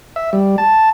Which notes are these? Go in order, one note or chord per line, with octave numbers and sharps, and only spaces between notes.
E5
G3
A5